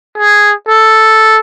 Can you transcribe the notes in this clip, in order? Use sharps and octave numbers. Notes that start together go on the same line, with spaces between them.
G#4
A4